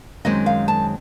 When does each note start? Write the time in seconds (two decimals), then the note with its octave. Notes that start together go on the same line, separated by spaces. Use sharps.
0.25 F#2 D#3 G#3 C4 D#5
0.46 F5
0.68 A5